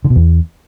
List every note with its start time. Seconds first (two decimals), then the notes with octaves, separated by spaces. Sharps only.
0.05 D3
0.10 B2
0.16 E2